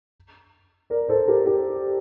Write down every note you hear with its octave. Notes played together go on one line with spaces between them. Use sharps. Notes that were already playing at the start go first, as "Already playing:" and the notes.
A#4 D5
A4 C5
G4 A#4
G4